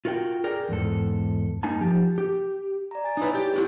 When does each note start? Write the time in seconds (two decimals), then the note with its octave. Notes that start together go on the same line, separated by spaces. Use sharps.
0.05 F4 F#4 A#4 D#5 G5
0.44 G#4 A#4 D5 G5
0.69 E2 G#2 A4
1.63 G2 A#3 D#4 G#5 A5
1.80 F3 G4 A5
2.18 G4
2.91 D5 A#5
3.04 G#5 A6
3.17 D#4 E4 B4 C#5
3.35 G4
3.54 E4 F4 G4